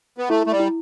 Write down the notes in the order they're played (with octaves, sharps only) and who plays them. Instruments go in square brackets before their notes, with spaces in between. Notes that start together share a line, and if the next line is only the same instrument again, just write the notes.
[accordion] B3
[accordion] A3 [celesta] E4
[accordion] A3
G3
[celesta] E4